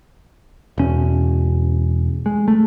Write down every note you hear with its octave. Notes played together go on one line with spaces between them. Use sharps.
E1 C#4
G#3
A3